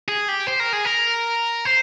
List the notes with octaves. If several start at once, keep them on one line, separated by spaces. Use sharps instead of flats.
G#4
G4
C5
A#4
G#4
A#4
C5